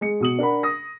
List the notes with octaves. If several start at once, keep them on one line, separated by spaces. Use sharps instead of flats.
G#3 C#7
B2 D#6 F#7
D4 A#4 F#5 B5
D#6 A#6